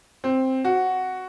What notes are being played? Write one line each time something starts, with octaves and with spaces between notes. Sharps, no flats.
C4
F#4